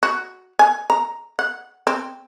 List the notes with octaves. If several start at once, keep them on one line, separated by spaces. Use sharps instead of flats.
F#4
G#5
A#5
F#5
C4